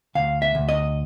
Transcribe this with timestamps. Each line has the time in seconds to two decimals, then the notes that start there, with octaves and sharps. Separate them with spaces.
0.15 D2 F5
0.42 E5
0.55 D2
0.69 D#5